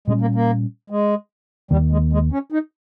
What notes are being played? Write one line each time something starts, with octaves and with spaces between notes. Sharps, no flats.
A#2 G3 G#3 C#4
A#3
A#3
G#3
D#2 D#3 G3 A#3
G#3
G#3
C#4
D#4